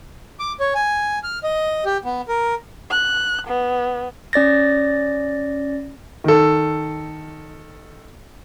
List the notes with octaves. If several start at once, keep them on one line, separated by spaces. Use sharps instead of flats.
D6
C#5
G#5
F6
D#5
G4
B3
A#4
F#6
B3
C#4 D5 A6 A#6
D#3 A4